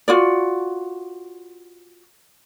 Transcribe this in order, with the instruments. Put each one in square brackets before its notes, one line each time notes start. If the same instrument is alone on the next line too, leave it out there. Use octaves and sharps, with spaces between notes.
[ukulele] F4 F#4 D5